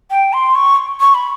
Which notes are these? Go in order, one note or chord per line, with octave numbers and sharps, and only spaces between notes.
G5
C6
C#6
C#6
B5